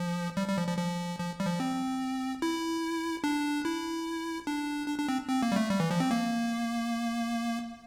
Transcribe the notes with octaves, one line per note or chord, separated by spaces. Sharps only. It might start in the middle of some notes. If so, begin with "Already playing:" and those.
Already playing: F3
G3
G3
F3
F3
F3
F3
G3
F3
C4
E4
D4
E4
D4
D4
D4
C4
C4
A#3
G3
A3
G3
E3
F3
C4
A#3